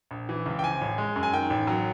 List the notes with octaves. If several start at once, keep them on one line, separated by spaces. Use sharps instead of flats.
A#1
E3
C#2
G5
F3 G#5
A1
G#3
F#2
G#5
D#3 G5
A1
F#3